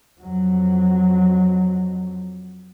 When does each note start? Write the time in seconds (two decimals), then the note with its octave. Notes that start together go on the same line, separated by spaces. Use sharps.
0.21 F2 F#3